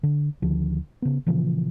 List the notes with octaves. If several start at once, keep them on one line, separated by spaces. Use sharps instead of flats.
D3
D2 D3 D#3 F3
C#3 B3
A#2 C#3 E3 F3